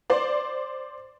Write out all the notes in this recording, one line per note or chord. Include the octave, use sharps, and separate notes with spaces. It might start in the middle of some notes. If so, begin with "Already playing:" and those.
C5 D5